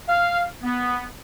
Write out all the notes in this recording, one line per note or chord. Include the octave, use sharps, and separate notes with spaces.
F5
B3